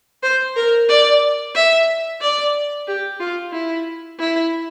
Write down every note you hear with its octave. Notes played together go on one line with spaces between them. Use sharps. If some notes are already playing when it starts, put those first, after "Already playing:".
C5
A#4
D5
E5
D5
G4
F4
E4
E4